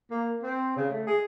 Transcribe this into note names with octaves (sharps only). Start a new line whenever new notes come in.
A#3
C4
C#3
A3
G#4